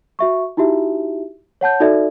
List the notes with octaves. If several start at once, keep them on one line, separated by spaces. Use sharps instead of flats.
F#4 E5 C#6
D#4 E4 F#4 G4 E5
C#5 F#5 A5 G6
D#4 F#4 A4 D5 E5